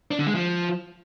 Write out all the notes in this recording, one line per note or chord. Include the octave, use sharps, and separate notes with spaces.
D4
D3
G#3
F3